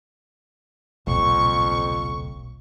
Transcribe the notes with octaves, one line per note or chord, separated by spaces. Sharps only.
D#1 B1 F2 C#3 C#6